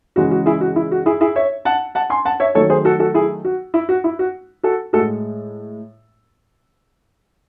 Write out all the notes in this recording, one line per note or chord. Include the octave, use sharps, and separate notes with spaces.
C#3 E3 G#3 F#4
F#4
E4 G#4
F#4
E4
F#4
E4 G#4
E4 G#4
C#5 E5
F#5 A5
F#5 A5
G#5 C6
F#5 A5
C#5 E5
D#3 F#3 A3 A4 C#5
G#4 C5
F#4 A4
F#4 A4
E4 G#4
F#4
E4
F#4
E4
F#4
F#4 A4
A2 G#3 F#4 A4